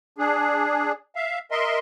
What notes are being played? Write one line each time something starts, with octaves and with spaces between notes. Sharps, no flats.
D4 G#4
E5 F5
A#4 D#5 E5 C6